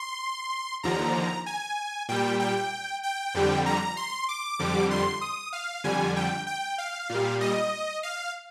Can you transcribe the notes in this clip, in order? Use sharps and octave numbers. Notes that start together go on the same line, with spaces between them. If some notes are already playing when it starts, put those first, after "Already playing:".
Already playing: C6
D#2 D3 F3 A#5
G#5
A#2 G3 G5
G5
G5
F2 D3 G3
A#5
C6
D6
F2 D3 G3
C6
D#6
F5
F2 D3 G3 G#5
G5
G5
F5
A#2
G3
D#5
F5